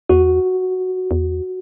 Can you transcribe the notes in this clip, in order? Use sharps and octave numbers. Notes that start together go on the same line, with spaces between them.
E2 F#4
E2